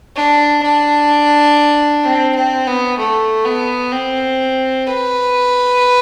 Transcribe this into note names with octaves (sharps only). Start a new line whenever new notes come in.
D4
D4
C4
C4
B3
A3
B3
C4
B4